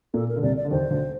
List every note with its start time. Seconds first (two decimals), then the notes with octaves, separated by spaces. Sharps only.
0.14 A#2 A#3 A4
0.28 A#4
0.36 D3
0.42 C2 C3 D5
0.57 D5
0.65 D3
0.71 D#2 D#3 C5
0.90 D2 D3